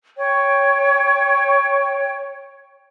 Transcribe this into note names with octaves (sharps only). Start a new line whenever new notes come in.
C#5 G5